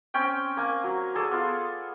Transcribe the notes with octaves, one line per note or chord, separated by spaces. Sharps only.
C4 C#4 G5
A#3 G#5
F#3
G#4 A4 D5
B3 F4